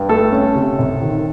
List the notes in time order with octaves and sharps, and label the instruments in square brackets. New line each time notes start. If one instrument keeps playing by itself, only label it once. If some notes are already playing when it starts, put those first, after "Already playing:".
Already playing: [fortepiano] G2
A3 A4
C#4
C3
C2
D#3